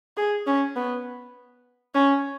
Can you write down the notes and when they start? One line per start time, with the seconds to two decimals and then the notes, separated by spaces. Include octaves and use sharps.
0.17 G#4
0.47 C#4
0.76 B3
1.95 C#4